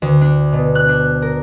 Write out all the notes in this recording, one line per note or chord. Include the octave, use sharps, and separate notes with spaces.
D2
D4
B2
F#6
D4
A#4